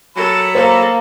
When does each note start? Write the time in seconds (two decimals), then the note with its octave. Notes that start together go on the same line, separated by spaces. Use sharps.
0.16 F#3 A4 A#5 B5
0.55 A#3 A4 C5